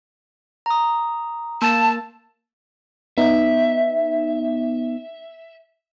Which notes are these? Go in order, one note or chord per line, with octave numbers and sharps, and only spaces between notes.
A#5 D#6
A#3 A5 A6
B3 D#4 E5